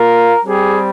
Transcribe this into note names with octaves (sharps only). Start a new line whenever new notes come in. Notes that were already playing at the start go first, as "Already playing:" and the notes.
Already playing: A#3 F4 A#4
G3 C4 G4 G#4